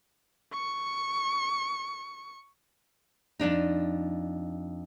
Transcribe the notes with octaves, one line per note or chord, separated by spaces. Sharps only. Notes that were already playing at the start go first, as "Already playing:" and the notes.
C#6 C#7
F2 A#2 D4 D#4